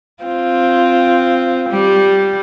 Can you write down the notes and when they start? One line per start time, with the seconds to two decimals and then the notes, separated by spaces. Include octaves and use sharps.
0.23 C4 F4
1.70 G3